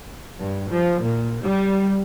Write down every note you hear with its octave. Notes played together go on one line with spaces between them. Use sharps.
G2
F3
A#2
G3